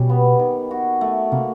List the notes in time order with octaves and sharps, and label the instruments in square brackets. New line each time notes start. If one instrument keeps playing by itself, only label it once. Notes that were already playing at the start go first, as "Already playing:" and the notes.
Already playing: [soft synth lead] B2 [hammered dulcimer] G3 C#4
[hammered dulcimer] B3
D#3
F#4
A3
[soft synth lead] C3 [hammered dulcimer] A#3